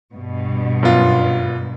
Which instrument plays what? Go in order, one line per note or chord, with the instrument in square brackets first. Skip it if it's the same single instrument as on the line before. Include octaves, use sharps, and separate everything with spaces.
[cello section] G2 B2
[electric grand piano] F#2 B3 F4